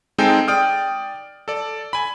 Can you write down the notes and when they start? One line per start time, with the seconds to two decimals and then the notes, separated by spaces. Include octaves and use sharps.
0.18 G#3 C4 D#4 G#4 A4 G5
0.48 D5 G5 D#6 F6
1.48 A4 D5
1.93 G#5 B5